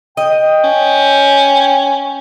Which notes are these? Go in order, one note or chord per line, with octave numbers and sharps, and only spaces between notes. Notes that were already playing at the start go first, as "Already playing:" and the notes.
D#5 G5
C#4